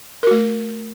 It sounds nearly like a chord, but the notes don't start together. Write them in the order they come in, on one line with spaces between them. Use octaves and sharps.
A#4 F#4 A3